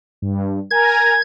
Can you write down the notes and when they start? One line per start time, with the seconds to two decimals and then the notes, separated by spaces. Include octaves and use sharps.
0.22 G2
0.71 A#4 G#5 A#5 G#6